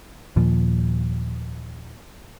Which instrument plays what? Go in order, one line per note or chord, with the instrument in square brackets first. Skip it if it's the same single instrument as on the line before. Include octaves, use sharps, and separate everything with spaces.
[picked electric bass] D#2 A#2 F3